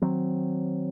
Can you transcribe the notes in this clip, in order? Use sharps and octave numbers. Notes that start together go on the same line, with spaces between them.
D#3 F#3 C4